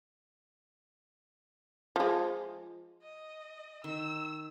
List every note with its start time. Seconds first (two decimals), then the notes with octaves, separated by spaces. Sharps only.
1.96 F3 G#3
3.02 D#5
3.84 D#3 E6